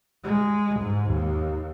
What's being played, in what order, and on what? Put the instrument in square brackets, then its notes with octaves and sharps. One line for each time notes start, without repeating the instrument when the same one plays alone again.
[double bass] G#3
G#2
D#2